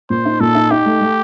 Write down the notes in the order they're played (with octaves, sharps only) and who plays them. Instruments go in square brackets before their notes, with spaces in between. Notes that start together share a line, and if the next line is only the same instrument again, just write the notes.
[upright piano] A#2 [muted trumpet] C5
[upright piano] D#4
[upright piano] A#2 [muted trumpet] A4
[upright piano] D#4
[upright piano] D#4 [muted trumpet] G4
[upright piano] A3
A3